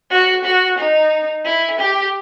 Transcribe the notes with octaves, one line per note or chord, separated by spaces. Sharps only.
F#4
F#4
D#4
E4
G4